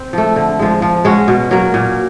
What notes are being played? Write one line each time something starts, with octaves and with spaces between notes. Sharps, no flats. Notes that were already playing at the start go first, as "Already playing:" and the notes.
Already playing: C4
F3 A3
D3
F3 G#3
F3
G#3 C#4 F#4
B2
F#3 A#3
A#2